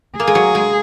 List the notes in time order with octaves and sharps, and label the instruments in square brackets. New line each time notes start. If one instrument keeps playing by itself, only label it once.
[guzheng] A#3 [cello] G#4
[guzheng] G#3
F#3
G#3